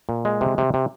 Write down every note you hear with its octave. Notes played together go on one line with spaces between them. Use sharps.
A#2
G#3
C3
C3
C3